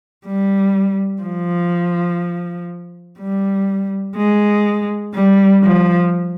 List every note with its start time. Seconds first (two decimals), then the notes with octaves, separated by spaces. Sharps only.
0.26 G3
1.22 F3
3.19 G3
4.17 G#3
5.14 G3
5.63 F3